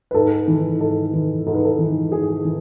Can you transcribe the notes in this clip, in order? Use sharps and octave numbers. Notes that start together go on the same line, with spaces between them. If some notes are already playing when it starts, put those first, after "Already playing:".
B4
G#2 A4
E3
G#2 A4
E3
G#2 A4
B4
A4
E3
G#2 G#4
E3